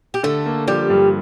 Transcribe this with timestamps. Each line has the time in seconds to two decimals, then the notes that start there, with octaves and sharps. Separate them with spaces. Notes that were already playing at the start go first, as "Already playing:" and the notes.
0.14 G4
0.23 D3 A3 A4
0.46 A#3
0.68 F3 G3 G4
0.90 G2